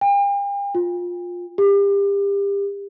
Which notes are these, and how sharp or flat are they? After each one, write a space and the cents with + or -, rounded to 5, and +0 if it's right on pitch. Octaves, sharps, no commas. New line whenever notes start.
G5 +45
F4 +15
G4 +30